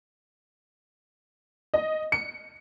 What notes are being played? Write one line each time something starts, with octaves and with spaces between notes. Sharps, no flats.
D#5
C#7